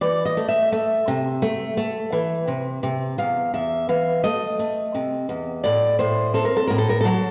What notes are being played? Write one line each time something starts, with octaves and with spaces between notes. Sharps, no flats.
E3 D5
D#5
A3
E5
A3 E5
C3
A3
A3
E3
C3
C3
E2 F5
E2 E5
E3 F5
A3 D#5
A3
C3
E2
A2 D5
A2 C5
C4 A4
A#4
A4
A2 A#4
A4
A#4
F#3 A4